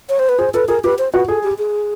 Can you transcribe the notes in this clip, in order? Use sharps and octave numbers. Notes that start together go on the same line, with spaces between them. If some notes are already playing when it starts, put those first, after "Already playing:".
C#5
C5
B4
G#4 C5
A4 B4
G#4 A#4
G4 B4
C5
F#4 B4
G#4 A4
G4
G#4